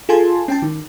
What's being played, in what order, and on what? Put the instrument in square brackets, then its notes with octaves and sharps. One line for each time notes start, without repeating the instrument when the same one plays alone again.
[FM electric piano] F4 G#4 A4 G#5 A5 C6
C#4 G5 A5
D#3